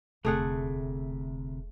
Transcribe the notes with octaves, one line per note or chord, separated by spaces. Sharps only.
E1 D2 C3 A3 G#4 F#5